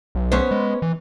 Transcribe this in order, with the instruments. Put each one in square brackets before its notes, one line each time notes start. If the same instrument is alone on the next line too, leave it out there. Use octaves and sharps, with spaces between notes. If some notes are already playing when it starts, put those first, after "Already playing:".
[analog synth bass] B1
[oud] B3 C#4 C5
[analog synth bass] G#3
E3